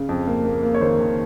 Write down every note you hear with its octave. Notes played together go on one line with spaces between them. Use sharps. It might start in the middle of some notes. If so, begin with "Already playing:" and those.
Already playing: C#3
F2
A#3
A#3
A#3
C#5
D#3 C5
D#3